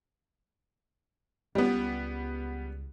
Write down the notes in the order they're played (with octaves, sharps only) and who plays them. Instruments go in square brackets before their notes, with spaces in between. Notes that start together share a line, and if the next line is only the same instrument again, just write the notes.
[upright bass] C#2 [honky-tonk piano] G3 B3